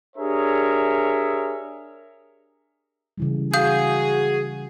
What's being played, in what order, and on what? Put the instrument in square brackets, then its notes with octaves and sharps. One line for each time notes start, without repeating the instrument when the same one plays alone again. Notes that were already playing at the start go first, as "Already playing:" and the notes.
[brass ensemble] D4 G4 G#4 A#4 C#5 E5
[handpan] C#3 E3 G3
[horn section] F#4 G#4 [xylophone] F5 D#6 G6